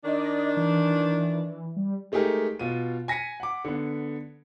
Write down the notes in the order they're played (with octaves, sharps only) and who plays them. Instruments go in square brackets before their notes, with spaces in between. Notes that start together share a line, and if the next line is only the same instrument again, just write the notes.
[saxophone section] D#3 D4 [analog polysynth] D5 D#5
[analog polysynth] E3
G3
[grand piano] G#3 A3 D#4 G4 G#4 A#4
B2 F4 D#7
G#5 A#6 B6 C#7 D#7
F#5 D6
D3 B3